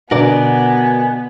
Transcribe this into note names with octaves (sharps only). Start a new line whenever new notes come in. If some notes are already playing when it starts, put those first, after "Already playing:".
B2 D3 B3 F#4 A#4 D5 G#5